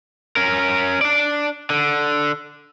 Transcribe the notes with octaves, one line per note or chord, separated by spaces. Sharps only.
C#4 A#4
D4 D5
D3